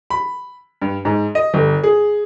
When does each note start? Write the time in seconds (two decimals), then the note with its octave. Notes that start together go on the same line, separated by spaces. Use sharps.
0.10 B5
0.82 G2
1.05 G#2
1.35 D#5
1.54 G1
1.83 G#4